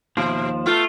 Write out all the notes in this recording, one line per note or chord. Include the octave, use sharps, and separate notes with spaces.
D#2 B2 F3
A3 B3 F4